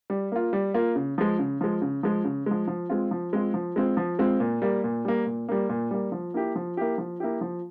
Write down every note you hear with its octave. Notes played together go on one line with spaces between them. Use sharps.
G3
A#3 F4
G3
A#3 F4
C#3
F3 G#3
C#3
F3 G#3
C#3
F3 G#3
C#3
F3 G#3
F3
G#3 C4 F4
F3
G#3 C4 F4
F3
G#3 C4 F4
F3
G#3 C4 F4
A#2
G3 A#3
A#2
G3 A#3
A#2
G3 A#3
A#2
G3 A#3
F3
A#3 E4 G4
F3
A#3 E4 G4
F3
A#3 E4 G4
F3